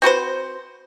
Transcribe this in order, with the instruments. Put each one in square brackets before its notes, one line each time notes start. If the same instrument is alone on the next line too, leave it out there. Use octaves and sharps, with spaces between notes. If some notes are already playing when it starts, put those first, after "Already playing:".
[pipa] C4 F#4 B4 C5